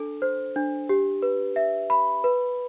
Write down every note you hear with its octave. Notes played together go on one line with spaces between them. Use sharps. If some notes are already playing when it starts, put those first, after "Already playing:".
Already playing: D4 A4
C5
D4
G4
B4
E5
B5
B4